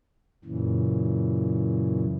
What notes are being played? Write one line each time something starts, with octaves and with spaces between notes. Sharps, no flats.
F#2 A#2 C#3 E3